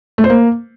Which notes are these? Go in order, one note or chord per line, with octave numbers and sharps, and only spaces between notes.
A3
C5
A#3